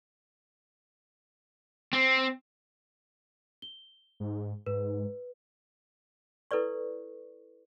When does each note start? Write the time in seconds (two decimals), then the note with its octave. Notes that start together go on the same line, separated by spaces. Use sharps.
1.93 C4
3.62 G7
4.20 G#2
4.66 G#2 B4
6.51 E4 A4 B4 D5 C#6